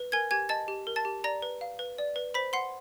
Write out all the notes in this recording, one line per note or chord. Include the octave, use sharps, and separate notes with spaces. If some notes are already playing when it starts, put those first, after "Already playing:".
Already playing: B4
A#4 G#5 G#6
G4 G#5 G#6
D#5 A5 A6
G4
A#4
A5 A6
G4
D5 A#5 A#6
B4
F5
B4
D5
B4
C5 B5 B6
F#5 C6 C7